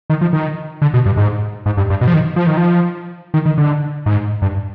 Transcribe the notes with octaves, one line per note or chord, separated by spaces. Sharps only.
D#3
F3
D#3
D3
B2
G2
G#2
G#2
G2
G2
B2
F3
D#3
F3
D#3
F3
D#3
D#3
D3
G#2
G2